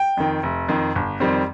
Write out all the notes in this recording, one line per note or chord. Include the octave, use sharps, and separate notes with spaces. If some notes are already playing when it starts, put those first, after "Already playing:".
Already playing: G5
F2 D#3
F1
F2 D#3
G1
F2 D#3 G3 C4